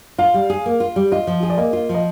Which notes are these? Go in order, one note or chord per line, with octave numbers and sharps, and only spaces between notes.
F4 F5
G3
G#4
A#3
F4
G3
F4 D#5
F3
G#4
D5
A#3 D#5
F4
F3
D#5